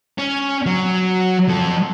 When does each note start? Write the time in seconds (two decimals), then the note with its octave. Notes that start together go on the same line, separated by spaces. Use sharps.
0.18 C#4
0.67 F#3
1.49 F3 A4